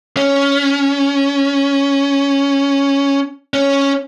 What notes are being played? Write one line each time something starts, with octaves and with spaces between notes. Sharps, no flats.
C#4
C#4